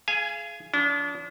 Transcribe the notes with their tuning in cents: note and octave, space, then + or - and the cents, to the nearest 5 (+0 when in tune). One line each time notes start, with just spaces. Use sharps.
G#4 +20 F5 -30 G#5 +0
F3 +15 D4 -40